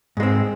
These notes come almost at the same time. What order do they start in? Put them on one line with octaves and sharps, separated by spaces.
G#2 G#3 C4